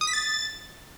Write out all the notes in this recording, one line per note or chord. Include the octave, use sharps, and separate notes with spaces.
D#6
B6
A6